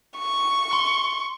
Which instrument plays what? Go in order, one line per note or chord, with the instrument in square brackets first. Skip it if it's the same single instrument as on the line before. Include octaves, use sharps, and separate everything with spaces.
[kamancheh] C#6
[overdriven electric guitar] C6